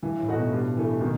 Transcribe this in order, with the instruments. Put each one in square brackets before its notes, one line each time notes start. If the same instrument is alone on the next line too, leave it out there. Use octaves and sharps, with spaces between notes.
[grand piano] G2 [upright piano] E3
[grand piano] A2
[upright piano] A3 D#4 F#4
[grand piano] B2
[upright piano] G2
E3 A3
[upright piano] B2 [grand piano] D#3